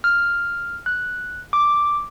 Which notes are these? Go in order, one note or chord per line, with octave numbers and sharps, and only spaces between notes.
F6
F#6
D6